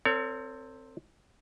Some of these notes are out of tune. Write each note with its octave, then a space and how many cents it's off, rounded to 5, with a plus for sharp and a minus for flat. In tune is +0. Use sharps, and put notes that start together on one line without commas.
C4 +0 A4 +45 C#5 +30